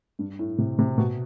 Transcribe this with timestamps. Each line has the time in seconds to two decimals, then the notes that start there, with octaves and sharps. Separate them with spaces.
0.19 G2
0.39 A2
0.58 C3
0.79 C3
0.98 B2